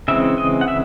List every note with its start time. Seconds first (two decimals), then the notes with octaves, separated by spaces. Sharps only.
0.08 C#3 E3 G#3 C4 E5
0.38 D#5
0.61 F#5
0.68 E5